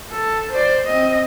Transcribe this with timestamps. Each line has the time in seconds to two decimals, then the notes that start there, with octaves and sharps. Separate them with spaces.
0.11 A4
0.51 C5 D5
0.85 C4 D#5